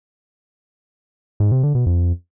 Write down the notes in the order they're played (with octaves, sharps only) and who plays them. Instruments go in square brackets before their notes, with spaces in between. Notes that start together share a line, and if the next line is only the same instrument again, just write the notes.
[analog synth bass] G#2
C3
D3
B2
F2